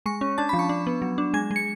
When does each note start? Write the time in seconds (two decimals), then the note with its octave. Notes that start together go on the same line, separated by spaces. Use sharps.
0.06 G#3 C#6
0.21 C#4
0.38 D4 A5
0.49 B5
0.53 F3
0.59 C#6
0.69 D4
0.87 B3
1.02 F#3
1.18 D4
1.34 G#3 G#6
1.51 G#3
1.56 C#7